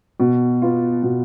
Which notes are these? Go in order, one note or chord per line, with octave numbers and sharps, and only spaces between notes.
B2
B3 F4
B2